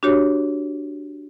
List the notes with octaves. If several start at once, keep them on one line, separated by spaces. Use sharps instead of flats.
D4 F#4 G4 C#5